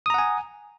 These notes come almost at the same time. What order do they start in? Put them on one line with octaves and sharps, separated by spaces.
D#6 A#5 F#5 G#5